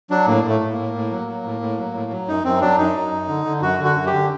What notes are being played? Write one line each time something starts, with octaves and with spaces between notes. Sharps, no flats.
F#3 D4
A2 A#3
A2
A3
A2
A#3
A2
A2
F#3
F#3
A2
A2
F#3
A2
F#3
F#2 D#4
F#2 C4
F#3 D4
F#2 D#4
F#3
F#2
D3
D3
F#2 F#4
D3
F#4
F#2
G4
D3